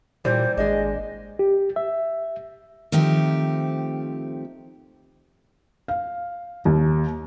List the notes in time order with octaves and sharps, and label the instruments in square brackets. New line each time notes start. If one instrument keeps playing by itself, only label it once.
[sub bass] A#2 [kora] E3 G3 A#3 [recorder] C5
[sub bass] G#1 [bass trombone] G#3 [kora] D4 G#4 [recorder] D#5
[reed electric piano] G4
E5
[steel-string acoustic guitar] D#3 F3 A3 C4 G4
[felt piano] F5
D#2